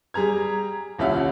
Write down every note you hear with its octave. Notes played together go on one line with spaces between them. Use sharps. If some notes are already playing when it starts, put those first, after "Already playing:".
G3 G#4 A#5 G#6
D#1 C2 C#4 F4 E5 F#5